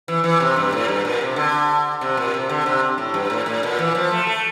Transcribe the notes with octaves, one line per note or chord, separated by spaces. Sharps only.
E3
E3
C3
G2
A2
G2
A#2
C3
D3
C3
A#2
C3
D3
C3
A2
G2
A2
A2
A#2
E3
F3
A3
A3